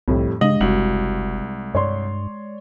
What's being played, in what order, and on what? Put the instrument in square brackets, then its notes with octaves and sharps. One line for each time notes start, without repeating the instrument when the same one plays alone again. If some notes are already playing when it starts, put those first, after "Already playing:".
[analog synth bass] C2 [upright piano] F2 A2 G3
[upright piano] G2 F#7 [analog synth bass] C#3 [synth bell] G#3 [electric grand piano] D#5
[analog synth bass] F#1 [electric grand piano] C2 [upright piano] F#4 F#7
[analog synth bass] G2 [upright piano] C#5 D5 C6